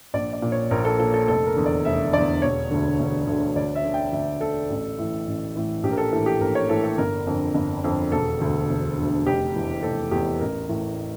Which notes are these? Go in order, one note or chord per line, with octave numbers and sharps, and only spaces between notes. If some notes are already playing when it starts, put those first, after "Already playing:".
A#1 D5
D5
A#2
C#5
A#1 A#4
A4
A#2 A4
A4
F1 A4
A#4
E2 D3
D5
F1 E5
E2 D3 D5
E1 C#5
D2 D3
E1
D2 D3
D2 D5
E5
D3
G5
D2 E5
D3 A4
A1
A2 E3
A1
A2 E3
A#1 G4
A#4
A4
A2 E3 A4
G4
A#1 A#4
C#5
A2 E3 A4
A4
G1 A#4
F2 D3
G1
F2 D3
E1 A4
D2 D3
E1
D2 D3
F1 G4
E2 E3
F1 A4
E2 E3 G4
A1 A#4
A2 E3